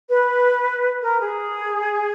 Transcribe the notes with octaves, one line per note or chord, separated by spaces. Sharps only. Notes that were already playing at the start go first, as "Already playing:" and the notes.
B4
A#4
G#4